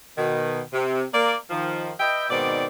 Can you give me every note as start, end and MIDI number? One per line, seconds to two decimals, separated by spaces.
0.17 0.61 47
0.17 0.61 51
0.73 1.04 48
1.14 1.36 58
1.14 1.36 74
1.50 1.92 51
1.50 1.92 53
1.99 2.29 71
1.99 2.29 75
1.99 2.29 76
1.99 2.29 79
2.30 2.66 44
2.30 2.66 47
2.30 2.66 51
2.30 2.66 60
2.30 2.66 74